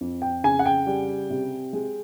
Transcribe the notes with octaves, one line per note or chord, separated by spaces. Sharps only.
F2
G5
C#3 G#5
F#5
G5
G3
C3
G#3